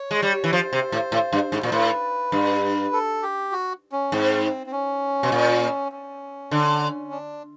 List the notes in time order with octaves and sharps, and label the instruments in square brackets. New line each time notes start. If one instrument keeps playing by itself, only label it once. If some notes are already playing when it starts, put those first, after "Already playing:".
Already playing: [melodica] C#5
[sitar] G#3
G3
E3
[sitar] F3 [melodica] C5
[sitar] C3
A2
A2
G2
G#2
A#2
[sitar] A2 [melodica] B4
[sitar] G2
[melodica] A4
G4
F#4
C#4
[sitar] G#2 [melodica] C4
[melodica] C4
C#4
[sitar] B2
A#2
[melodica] C#4
[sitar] D3
[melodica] D4